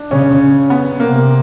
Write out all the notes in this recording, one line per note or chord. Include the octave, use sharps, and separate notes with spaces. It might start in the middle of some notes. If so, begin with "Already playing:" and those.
Already playing: D4
C#3 C#4
B3
C3 A#3